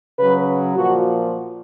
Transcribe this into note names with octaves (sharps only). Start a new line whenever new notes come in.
C#3 F#3 B4
A#2 F3 F#4